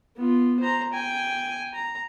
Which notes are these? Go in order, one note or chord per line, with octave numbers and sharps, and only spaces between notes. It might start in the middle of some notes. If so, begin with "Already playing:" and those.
B3 F4
C5 A#5
G5 G#5
A#5